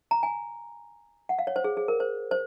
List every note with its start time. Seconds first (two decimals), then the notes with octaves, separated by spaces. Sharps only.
0.11 A#5
0.23 G#5
1.29 F#5
1.39 F5
1.47 C#5
1.56 C5
1.64 G#4
1.77 G#4
1.88 A#4
2.00 C5
2.31 C5